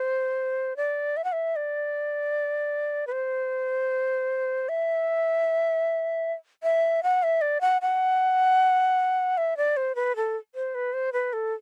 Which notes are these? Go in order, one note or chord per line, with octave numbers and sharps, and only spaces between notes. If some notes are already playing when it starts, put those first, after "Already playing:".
Already playing: C5
D5
E5
F#5
E5
D5
B4
C5
E5
E5
F#5
E5
D5
F#5
F#5
E5
D5
C5
B4
A4
C5
B4
C5
B4
A4